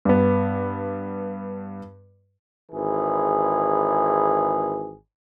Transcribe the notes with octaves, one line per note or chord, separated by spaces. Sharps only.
G2 B3
G#1 E3 G#4